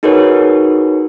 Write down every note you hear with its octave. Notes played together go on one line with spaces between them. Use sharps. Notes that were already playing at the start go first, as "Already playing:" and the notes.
D#4 F#4 G#4 A#4 B4 C#5